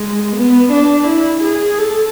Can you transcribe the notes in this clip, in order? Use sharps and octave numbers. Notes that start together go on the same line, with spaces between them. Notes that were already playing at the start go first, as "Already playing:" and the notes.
Already playing: G#3
B3
D4
E4
G#4
A4